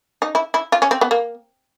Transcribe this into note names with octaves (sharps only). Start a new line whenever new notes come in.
D#4
E4
E4
F4
C#4
C4
B3
A#3